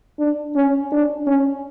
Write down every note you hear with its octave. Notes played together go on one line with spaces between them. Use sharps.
D4
C#4
D4
C#4